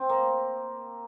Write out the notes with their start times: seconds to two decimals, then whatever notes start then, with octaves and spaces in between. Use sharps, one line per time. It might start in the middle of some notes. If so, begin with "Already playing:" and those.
Already playing: C4
0.09 A#3